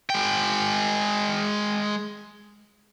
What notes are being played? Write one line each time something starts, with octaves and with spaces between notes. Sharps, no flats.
G#3 G5